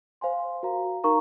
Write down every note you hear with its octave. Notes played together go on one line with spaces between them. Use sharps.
C5 F5 G#5 C6
F#4 A#4 F5 A#5
D#4 A#4 F5 A#5 C#6